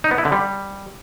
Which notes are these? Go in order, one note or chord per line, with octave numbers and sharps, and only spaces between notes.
D#4
B3
E4
D3
G3